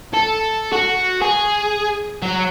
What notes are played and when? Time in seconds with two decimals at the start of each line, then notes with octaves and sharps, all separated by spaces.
0.14 A4
0.72 F#4
1.22 G#4
2.22 F#3